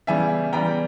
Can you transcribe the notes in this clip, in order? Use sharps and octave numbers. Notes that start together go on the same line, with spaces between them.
C#3 E3 G3 B3 E5 G#5
C#3 E3 G3 B3 G5 A#5